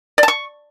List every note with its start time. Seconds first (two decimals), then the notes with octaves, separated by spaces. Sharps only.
0.18 D5
0.23 A5
0.28 C#6